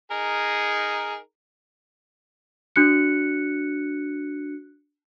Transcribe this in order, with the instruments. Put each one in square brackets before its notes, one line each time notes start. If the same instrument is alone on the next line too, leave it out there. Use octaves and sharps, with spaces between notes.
[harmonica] D#4 G#4 A#4
[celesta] D4 F#4 F#6 C#7